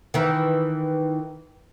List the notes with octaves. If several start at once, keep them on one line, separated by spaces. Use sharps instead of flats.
D#3 E3